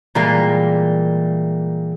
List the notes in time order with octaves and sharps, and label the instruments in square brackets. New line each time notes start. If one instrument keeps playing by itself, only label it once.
[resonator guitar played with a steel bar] A#2 G3 A#3 [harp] E3 G#3